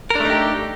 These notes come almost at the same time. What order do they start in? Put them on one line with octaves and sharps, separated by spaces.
A#4 D4 A3 D#4 G4